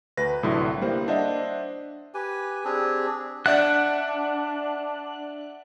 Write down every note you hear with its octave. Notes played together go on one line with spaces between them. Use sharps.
D2 B4 A#6
C2 A2 D3 F#3 E4 C6
G3 A#3 E4 C5
D4 C5 D#5 E5 F#5
G4 B4 G#5
C4 D4 G4 G#4
D4 D5 E5 F#5 F#6